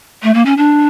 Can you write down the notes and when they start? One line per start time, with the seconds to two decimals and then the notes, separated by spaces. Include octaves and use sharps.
0.23 A3
0.34 A#3
0.46 C#4
0.57 D4